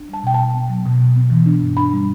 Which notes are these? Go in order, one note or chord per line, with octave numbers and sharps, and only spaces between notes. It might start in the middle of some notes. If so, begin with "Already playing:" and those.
Already playing: D4
G3 A5
B2 G5
B2 A5
B3
F#3
B2
B2
B3
E3
D4
G2
D4 B5
G3